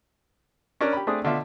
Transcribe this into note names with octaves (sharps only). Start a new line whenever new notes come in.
C#4 D4 A#4
G4 B5
A3 C4 D4 G#4 D#6
B2 D3 F4 E5